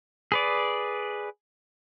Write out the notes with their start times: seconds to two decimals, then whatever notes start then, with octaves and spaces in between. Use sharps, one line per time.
0.32 G#4 B4 D5